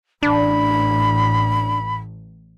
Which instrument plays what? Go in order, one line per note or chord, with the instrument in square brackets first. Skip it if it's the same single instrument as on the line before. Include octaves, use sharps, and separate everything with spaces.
[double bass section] A1 [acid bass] D4 [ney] B5